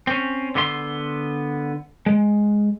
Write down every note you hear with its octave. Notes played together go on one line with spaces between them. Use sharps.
C4 C#4
D3 B3 D#5 C6
G#3